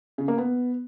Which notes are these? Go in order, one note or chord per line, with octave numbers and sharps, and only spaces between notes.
C#3
A#3
B3